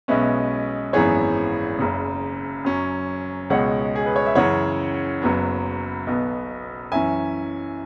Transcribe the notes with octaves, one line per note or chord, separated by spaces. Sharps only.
B1 B2 G#3 C#4 B4 E5
G#1 F#2 E3 B3 G#4 C#5
F#1 F#2 C#3
F#2 F#3 C#4
C#2 B2 G#3 C#5 F#5
G#4
B4
C#5
E5
F#2 C#3 E3 C#5 F#5
F#1 F#2 F#3 B3
B1 B2 B3
F#2 E3 C#4 E5 G#5